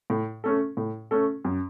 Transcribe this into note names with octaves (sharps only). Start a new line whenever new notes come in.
A2
A3 C#4 A4
A2
A3 C#4 A4
F#2